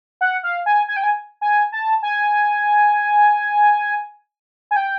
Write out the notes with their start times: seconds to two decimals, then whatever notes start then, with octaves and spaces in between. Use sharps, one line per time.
0.21 F#5
0.43 F5
0.66 G#5
0.88 G#5
0.97 G5
1.03 G#5
1.41 G#5
1.72 A5
2.03 G#5
4.71 G#5
4.76 G5